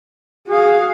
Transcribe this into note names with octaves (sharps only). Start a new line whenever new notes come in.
F#4 G#4 F5